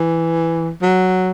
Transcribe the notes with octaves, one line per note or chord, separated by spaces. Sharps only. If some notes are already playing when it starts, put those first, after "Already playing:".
Already playing: E3
F#3